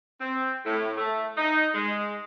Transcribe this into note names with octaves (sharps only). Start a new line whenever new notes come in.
C4
A2
A3
D#4
G#3